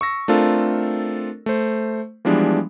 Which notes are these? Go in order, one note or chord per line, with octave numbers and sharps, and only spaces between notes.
C#6 E6 A#6
A3 C4 D4 F4 A4 A#4
A3 C5
E3 F3 G3 G#3 B3 D4